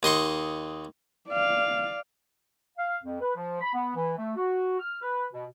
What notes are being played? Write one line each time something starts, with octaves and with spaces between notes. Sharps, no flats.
D#2 D#5 C6 C#6
D5 F5
F5
F2
B4
F3
B5
B3
E3
A3
F#4
F6
B4
B2